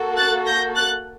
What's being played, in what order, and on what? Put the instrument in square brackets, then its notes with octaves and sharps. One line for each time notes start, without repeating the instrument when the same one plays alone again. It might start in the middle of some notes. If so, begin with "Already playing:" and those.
Already playing: [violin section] A#3 F#4 A4
F#6 A6
G6 A#6
F#6 A6